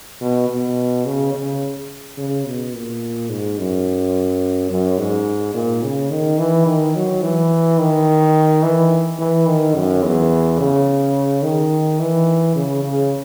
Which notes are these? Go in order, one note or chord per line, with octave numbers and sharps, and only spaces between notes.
B2
B2
C#3
C#3
C#3
B2
A#2
G#2
F#2
F#2
G#2
A#2
C#3
D#3
E3
D#3
F#3
E3
D#3
E3
E3
D#3
F#2
E2
C#3
D#3
E3
C#3
C#3